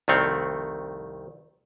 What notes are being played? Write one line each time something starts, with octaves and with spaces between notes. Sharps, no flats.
C2 F2 D#3 A3 C4 C#5